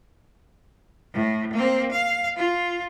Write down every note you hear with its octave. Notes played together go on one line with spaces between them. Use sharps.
A2
A#3 C4
F5
F4